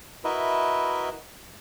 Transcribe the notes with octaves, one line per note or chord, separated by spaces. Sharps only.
E4 F#4 A#4 B4 D#5 E5